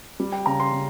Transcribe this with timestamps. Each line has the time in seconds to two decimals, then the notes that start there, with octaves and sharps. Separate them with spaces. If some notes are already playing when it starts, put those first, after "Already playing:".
0.20 G3
0.32 G5
0.46 C#3 A#5
0.60 C6
0.73 C#3